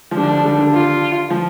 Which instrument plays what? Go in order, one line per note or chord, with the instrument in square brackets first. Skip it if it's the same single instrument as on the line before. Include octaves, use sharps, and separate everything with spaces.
[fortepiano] F3
[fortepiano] D3 G3 [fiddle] D4
[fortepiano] F3
D3
D3 G3
D3 G3
[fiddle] F4
[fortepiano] F3